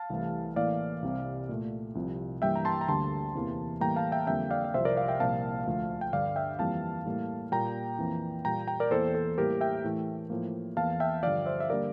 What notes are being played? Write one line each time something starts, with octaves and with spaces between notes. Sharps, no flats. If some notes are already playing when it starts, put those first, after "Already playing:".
Already playing: F5 A5
C2 C3 E3 A3
A2 E3 A#3 D5 F5
C2 C3 G3
A#2 A3
C2 C3 F3
G2 E3 G3 A#3 E5 G5
A#5
A5 C6
A#5
D2 D3 G3 A#3 A5 C6
E2 C3 E3 A#3
A2 E3 G3 A#3 G5 A#5
F5 A5
E5 G5
F2 D3 G3 A#3 E5 G5
D5 F5
F5
C2 C3 F3 C5 E5
A#4 D5
D5 F5
E5 G5
C2 A#2 F3 A#3 F5 A5
D2 D3 F3 A3
G5
G2 D3 G3 D5 F5
E5 G5
F2 E3 G3 A#3 F5 A5
A2 G3 A#3
A#2 G3 A#3 G5 A#5
F2 E3 A#3
A#2 G3 A#3 G5 A#5
G5 A#5
A#4 D5
E2 E3 A#3 A4 C5
A4
A2 G3 A#3 G4 A#4
E5 G5
A2 E3 A3
A2 F3 A#3
E2 E3 A#3 F5 A5
E5 G5
G2 D3 F3 D5 F5
C5 E5
E5
D3 G3 A#3 A#4 D5